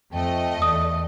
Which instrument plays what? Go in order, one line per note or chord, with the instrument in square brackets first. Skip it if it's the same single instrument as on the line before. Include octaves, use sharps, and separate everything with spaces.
[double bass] F2 [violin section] A3 D#5 [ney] G5
[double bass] E2 [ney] D5 [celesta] D#6